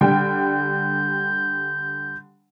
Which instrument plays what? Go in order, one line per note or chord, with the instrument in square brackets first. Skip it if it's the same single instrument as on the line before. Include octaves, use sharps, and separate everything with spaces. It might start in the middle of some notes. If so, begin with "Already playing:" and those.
[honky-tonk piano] D3 G3 G5 [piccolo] G6